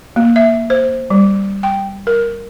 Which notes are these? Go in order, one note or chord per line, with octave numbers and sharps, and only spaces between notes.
A#3
E5
C5
G3
G5
A#4